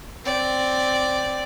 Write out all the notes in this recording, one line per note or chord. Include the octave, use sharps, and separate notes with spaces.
C4 D5